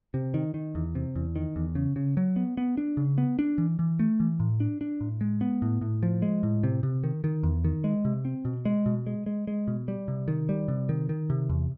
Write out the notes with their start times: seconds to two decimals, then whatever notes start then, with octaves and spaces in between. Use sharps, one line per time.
0.14 C3
0.34 D#3
0.54 D#3
0.75 E2
0.95 C3
1.16 E2
1.36 D#3
1.56 E2
1.75 C#3
1.96 C#3
2.17 F#3
2.36 B3
2.57 B3
2.77 D4
2.97 C#3
3.18 B3
3.39 D4
3.58 E3
3.79 E3
3.99 A3
4.20 E3
4.40 A2
4.60 D4
4.81 D4
5.01 A2
5.21 G#3
5.41 B3
5.62 A2
5.81 A2
6.03 F3
6.22 G#3
6.43 A2
6.63 C3
6.83 C3
7.04 D#3
7.24 D#3
7.43 E2
7.64 D#3
7.84 G#3
8.05 C3
8.25 C4
8.45 B2
8.65 G#3
8.86 B2
9.07 G#3
9.26 G#3
9.47 G#3
9.68 B2
9.88 G3
10.08 C3
10.28 D#3
10.49 G3
10.68 C3
10.89 D#3
11.09 D#3
11.30 C3
11.49 E2